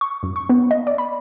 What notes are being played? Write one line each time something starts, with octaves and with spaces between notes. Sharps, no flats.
C#6
F#2
C#6
B3
D#5
D5
B5